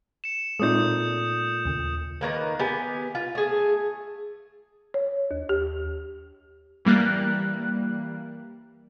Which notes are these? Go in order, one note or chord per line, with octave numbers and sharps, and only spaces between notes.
C#7 E7
A#2 G#3 A3 C4 D#4 D#6 G6
D#2 C#3
D#3 F#3 A#3 B4
B3 G4 G#5
F4
A3 G#4
C#5
D#2
G4
E3 G3 A#3 F#6